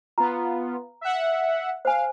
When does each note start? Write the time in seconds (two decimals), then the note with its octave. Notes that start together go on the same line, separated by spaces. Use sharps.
0.18 B3 F4 A#5
1.01 E5 F#5
1.85 C5 F5 G#5